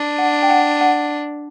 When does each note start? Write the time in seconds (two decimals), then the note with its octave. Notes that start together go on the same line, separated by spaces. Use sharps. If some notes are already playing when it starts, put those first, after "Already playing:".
Already playing: D4
0.18 F#5
0.43 G5
0.50 F#5
0.81 F#5